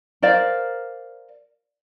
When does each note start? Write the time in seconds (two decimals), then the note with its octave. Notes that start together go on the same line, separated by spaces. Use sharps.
0.22 A#4 C5 D5 F5